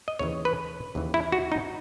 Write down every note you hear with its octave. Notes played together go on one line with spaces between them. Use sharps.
D#5
D#2 C#3 E3 C#5
B4
D#2 C#3 E3
E4
F#4
D#4